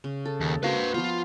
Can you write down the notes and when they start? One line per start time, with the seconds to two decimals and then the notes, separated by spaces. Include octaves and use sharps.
0.04 C#3
0.25 A4
0.41 D#2
0.63 A#3 F#4 B4 C5 F5
0.94 F3 B3 F4